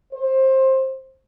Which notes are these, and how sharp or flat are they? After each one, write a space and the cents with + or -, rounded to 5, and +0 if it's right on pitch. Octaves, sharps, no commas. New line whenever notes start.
C5 +20